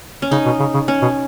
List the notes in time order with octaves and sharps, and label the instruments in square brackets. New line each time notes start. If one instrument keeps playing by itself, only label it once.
[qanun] C#4
[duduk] C#3 [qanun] D#4
[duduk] B2
C#3
C#3
[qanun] C#4
[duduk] B2